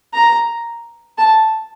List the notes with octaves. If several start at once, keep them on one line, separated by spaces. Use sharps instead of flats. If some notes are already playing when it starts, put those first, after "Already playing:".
A#5
A5